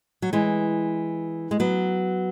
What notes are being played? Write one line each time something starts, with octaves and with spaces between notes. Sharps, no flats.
F#3
E3 G#3
G#3
F#3 B3